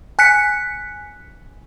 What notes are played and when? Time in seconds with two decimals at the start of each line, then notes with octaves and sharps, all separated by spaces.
0.19 G#5 F#6 B6 C#7